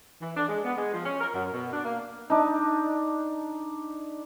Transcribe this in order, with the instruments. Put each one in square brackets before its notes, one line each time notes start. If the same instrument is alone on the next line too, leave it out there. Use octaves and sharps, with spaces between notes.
[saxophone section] E3
D4
G#3
B3
G#3
F3
C#4
A#4
F#2
B2
D4
A#3
[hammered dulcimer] D4 D#4